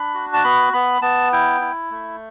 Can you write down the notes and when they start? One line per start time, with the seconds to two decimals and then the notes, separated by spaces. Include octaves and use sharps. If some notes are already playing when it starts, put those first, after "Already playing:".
Already playing: D4 B5
0.14 F#4
0.34 A5
0.44 B3 B5
0.73 B3 B5
1.02 B3 A5
1.32 E4 G5
1.61 E4
1.90 A3